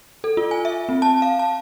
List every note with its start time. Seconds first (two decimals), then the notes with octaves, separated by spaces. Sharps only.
0.24 A4
0.37 F4
0.51 G#5
0.65 E5
0.89 C4
1.02 A5
1.22 F5
1.39 A5